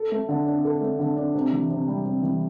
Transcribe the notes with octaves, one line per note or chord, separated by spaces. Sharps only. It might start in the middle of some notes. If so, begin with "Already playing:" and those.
Already playing: A4
A3
D3
D4
A4
A3
D3
D4
C3
E3
C3
G3
C3
E3